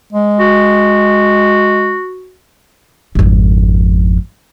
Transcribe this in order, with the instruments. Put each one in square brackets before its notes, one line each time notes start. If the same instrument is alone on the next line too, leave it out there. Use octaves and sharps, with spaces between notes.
[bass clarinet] G#3
[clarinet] F#4
[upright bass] G#1 F2